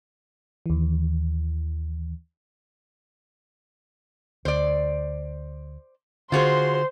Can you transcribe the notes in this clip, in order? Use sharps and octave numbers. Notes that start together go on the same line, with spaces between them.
D#2 E3
D2 C5 D5
D3 F4 F#4 G#4 C5 C6